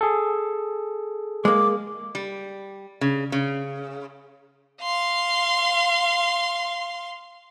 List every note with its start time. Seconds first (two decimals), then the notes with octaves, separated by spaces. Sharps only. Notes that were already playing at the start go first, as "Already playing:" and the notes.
0.01 G#4 A4
1.45 G#3 A#3 D6
2.15 G3
3.01 C#3
3.32 C#3
4.82 F5 C6